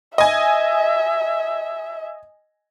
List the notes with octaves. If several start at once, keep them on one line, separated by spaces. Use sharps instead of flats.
D#5 E5 G#5